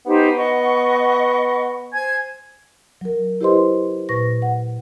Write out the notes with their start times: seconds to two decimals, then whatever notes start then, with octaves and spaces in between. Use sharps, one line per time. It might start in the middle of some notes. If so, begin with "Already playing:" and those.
0.06 B3 D#4 G4 C5
0.37 D#5 F#5 C#6
1.93 C5 G#5 G#6
3.01 F#3 A#4
3.41 E4 G4 B4 C5 D#5 C6
4.09 A#2 B4 C#6 A#6
4.42 F#5